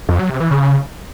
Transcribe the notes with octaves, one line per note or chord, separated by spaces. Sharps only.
F2
F#3
C3
E3
C#3